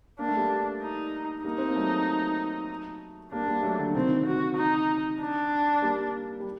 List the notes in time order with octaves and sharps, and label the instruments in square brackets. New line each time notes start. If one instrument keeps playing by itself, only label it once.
[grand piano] A#3 [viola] D4
[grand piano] A3
G3 A#3
[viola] D#4
[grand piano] G3 A#3 [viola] D#4
[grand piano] C4
A#3
F#3 A3
[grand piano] G3 A#3 [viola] D4
[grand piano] G3 A#3
F#3 A3
D3 F#3
[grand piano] C3 D#3 [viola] C4
[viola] F#4
D#4
D4
[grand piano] G3 A#3
G3